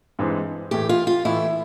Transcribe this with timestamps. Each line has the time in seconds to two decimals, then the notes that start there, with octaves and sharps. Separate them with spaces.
0.19 G2 E3 G#3 C4 D#4
0.71 A2 E3 A3 G4
0.89 F4
1.07 F4
1.25 A2 E3 A3 E4